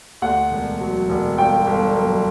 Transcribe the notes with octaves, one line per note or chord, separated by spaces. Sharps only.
D2 F#5
E1
F#3
E1
G1 G5
G1
F#2